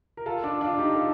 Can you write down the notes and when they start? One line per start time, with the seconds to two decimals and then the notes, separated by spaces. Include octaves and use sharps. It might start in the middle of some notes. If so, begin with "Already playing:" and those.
0.17 A#4
0.26 F4 A4
0.43 D4 F4
0.61 D4 F4
0.78 D#4 G4
0.95 F4 A4